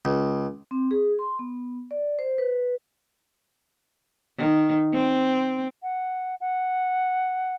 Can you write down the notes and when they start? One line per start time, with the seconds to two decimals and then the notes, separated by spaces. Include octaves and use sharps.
0.05 C#2
0.71 C4
0.91 G#4
1.19 C6
1.39 B3
1.91 D5
2.19 C5
2.38 B4
4.38 D#3
4.93 C4
5.83 F#5
6.41 F#5